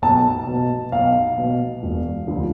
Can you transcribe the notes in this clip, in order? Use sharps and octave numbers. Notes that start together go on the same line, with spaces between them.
B1 A5
B2
B1 F5
B2
E1
D2 D3 F3